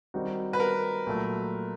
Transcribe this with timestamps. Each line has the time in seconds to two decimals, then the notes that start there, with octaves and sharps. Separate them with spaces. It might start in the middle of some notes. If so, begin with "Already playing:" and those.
0.14 D#3 G3 C4 D#4 F#4
0.53 B4
0.60 A#4
1.07 A#2 F#3 A3